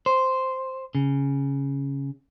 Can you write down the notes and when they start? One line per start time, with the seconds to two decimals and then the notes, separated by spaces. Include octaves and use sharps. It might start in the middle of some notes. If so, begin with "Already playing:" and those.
0.06 C5
0.95 C#3